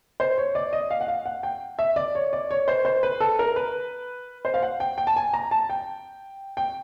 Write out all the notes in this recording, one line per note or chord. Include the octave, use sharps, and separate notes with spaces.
C5
C#5
D5
D#5
F5
F#5
F5
F#5
G5
E5
D5
C#5
D5
C#5
C5
C5
B4
A4
A#4
B4
C5
F5
F#5
G5
G5
A5
G#5
A#5
A5
G5
G5